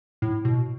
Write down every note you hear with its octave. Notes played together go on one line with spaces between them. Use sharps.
A2
B2